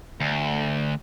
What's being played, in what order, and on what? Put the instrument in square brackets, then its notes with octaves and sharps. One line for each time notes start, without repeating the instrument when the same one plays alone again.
[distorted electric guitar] D2